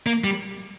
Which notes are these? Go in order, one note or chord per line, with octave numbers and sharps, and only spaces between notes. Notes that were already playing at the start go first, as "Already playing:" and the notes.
A#3
G3